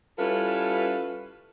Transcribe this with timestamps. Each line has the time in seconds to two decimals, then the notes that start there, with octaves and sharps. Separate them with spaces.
0.18 G3 C#4 E4 F4 A4 B4